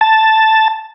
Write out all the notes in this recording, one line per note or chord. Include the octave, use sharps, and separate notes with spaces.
A5